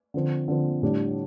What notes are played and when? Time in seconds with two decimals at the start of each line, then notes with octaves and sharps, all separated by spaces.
0.14 D3 F3 C4
0.48 D3 F3 C4
0.82 A2 G3 D4